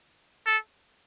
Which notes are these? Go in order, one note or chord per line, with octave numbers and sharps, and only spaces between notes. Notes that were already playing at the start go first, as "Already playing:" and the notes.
A4